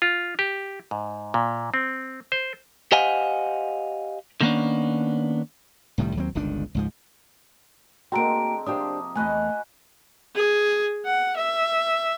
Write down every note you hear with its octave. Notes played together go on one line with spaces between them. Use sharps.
F4
G4
G#2
A#2
C4
C5
G4 C5 D#5 F5 F#5 G#5
D3 D#3 A#3 B3 C#4 D4
C2 A2 D#3 G3
D#2 F#3 C4
G1 C#2 D#3 D4
C#2 G#2 F3
D3 G#3 A#3 C4 F#4 G5 A#5 D7
C3 F3 A#3 D4 G4 C5 D#6
E2 A3 F#4 B4 D#5 G#5 F#6
G#4
F#5
E5